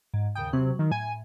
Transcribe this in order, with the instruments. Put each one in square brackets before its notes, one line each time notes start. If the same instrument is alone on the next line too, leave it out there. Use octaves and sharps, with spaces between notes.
[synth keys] G#2
[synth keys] D#2 C#3 D#6 [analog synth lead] G5
[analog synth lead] C3 [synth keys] F#3
[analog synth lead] D#3
[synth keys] A2 [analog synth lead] G#5